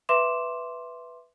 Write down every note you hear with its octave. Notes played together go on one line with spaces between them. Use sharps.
B4 E5 C6 D6 E7